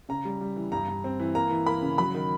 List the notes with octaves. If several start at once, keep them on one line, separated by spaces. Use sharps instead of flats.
C#3 A#5
G3
G3
E3
G2 A#5
G2
C4
E3
A#3 A#5
E3
A#3 B5
C#3
F#3 B5
D#3